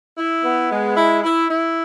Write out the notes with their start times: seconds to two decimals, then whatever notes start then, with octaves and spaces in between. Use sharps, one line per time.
0.17 E4
0.44 B3
0.70 G#3
0.97 E4
1.23 E4
1.50 E4